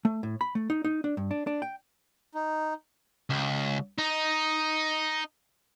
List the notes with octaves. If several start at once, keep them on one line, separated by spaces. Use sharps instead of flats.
A3
A2
B5
A3
D#4
D#4
D4
G2
D4
D4
G5
D#4
C#2
D#4